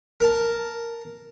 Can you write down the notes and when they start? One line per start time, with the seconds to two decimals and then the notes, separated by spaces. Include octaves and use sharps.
0.20 A#4 A5